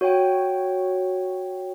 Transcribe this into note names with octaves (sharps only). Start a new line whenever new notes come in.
F#4 C#5 G5